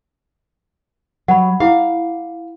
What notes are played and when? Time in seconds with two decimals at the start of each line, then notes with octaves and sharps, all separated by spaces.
1.28 F#3 F#5 B5
1.60 E4 F5 D6